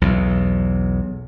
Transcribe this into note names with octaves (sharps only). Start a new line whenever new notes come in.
B1 E2